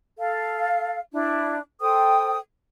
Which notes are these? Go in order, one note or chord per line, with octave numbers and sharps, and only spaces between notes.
A4 F5
D4 E4
A4 C5 G5 D#6